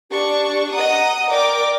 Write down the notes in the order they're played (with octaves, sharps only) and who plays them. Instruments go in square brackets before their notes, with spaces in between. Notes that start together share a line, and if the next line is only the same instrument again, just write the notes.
[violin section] D4 C#6 [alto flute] G4
[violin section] D#5 F#5 D#6 [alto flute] A#5
[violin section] A#4 G5 D6 [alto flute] D5